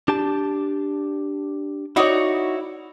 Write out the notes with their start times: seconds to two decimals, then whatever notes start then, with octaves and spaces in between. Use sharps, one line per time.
0.08 D4 G4 A5
1.96 D#4 E4 F#4 C#5 D5